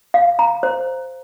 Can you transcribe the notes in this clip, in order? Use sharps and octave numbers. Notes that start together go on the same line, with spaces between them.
F5
A#5
C5